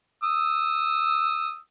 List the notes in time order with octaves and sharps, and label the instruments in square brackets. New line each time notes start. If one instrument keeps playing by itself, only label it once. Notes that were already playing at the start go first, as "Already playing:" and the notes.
[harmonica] D#6 E6